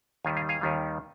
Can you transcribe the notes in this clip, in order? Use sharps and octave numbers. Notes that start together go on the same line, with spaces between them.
D#2 D#3 G3 F5 G#5
F5 G#5
F5 G#5
D#2 D#3 G3